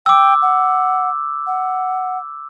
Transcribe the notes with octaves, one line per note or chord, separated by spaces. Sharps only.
G5 D6 E6
F#5
F#5